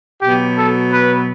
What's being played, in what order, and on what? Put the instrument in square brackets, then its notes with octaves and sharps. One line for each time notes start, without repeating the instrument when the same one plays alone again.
[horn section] B2 F#3 G4
A4
B4